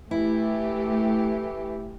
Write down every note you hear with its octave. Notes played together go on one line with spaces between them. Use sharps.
E3 A3 E4 G4